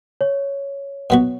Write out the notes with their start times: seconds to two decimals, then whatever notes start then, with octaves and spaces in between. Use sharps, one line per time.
0.21 C#5
1.10 B2 F#3 B3 F#4